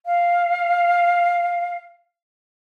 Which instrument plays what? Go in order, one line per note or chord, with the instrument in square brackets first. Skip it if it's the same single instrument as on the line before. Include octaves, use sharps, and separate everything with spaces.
[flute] F5